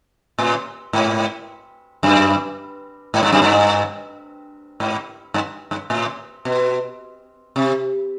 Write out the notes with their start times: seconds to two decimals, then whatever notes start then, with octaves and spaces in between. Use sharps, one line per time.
0.39 A2
0.93 G#2
2.03 F#2
3.14 G#2
3.23 G2
3.32 F#2
3.42 G2
4.80 G#2
5.34 G2
5.71 G2
5.90 A2
6.45 B2
7.56 C3